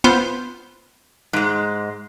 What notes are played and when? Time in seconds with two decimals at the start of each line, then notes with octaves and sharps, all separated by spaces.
0.04 B3 F4 C5
1.33 G#2 G#3